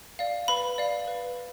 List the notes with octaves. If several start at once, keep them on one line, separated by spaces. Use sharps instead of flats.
D5 F5
B4 B5
D5 F5
B4